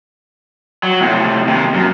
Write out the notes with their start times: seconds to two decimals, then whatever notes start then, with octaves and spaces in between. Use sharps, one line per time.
0.83 F#3
1.01 A2 C3
1.47 D#2 C3
1.74 F#2